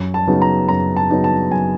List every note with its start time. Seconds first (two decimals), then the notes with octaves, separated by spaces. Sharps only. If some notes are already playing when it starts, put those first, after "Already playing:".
Already playing: F#2
0.14 A5
0.27 C#3 F#3 B3 D#4
0.42 A#5
0.68 F#2 A#5
0.97 A5
1.10 C#3 F#3 B3 D#4
1.24 A5
1.51 F#2 G#5